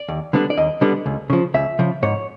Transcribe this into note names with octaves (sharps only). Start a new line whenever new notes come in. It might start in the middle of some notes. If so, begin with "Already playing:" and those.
Already playing: D5
D#2
D3 G3 B3 D4
D5
D#2 D#5
D3 G3 B3 D4
C#2
C#3 F3
C#2 E5
C#3 F3
G#2 C#5